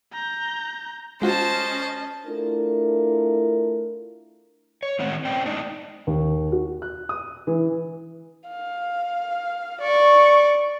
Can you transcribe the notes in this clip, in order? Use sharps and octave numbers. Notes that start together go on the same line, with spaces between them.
A#5 G6
G#3 C#4 F4 F#4 C5 D#5 A5
A3 D4 E4 F4 A4 A#4
C#5
A2 D#3 G#3 C4 C5 F#5
A#3 C#4 C5 D5 G5
G#3 D4 D#4
D#2
F#4
F#6
D#6
E3
F5
D5 C#6